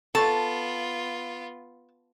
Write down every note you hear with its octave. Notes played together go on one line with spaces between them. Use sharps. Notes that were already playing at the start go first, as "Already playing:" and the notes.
B3 F4 A4 A5 C#6